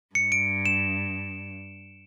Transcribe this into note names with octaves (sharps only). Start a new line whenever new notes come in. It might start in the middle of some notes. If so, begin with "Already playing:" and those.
G2 C#7
D7
E7